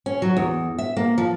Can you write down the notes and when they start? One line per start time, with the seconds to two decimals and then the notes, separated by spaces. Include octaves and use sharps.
0.06 C#4
0.22 F#3
0.37 E2
0.78 E5
0.97 A#3
1.18 F3